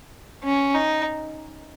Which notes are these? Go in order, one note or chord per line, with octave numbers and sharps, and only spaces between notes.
C#4
D#4